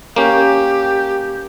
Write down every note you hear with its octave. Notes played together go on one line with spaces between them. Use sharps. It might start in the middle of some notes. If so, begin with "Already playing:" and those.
A#3 C#4 G4